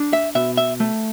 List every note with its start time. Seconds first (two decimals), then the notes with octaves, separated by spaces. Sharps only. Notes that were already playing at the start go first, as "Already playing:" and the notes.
Already playing: D4
0.13 E5
0.35 B2 E5
0.57 E5
0.80 A3